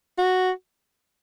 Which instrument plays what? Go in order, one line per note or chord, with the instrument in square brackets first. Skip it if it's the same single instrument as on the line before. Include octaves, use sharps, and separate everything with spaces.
[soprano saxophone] F#4